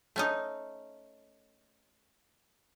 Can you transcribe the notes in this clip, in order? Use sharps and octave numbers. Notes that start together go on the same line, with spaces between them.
A3 C#4 D#4